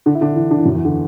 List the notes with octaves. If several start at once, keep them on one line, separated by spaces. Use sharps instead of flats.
D3 D4
E4
D3 D4
E3 E4
D3 D4
E3
F#2 F#3
E2 E3
D3